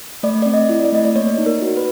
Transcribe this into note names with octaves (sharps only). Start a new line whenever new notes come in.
A3 D5
C4 D5
D#5
E4
D5
A3 D#5
D5
A#3 C#5
D#4
A#4
F#4
B4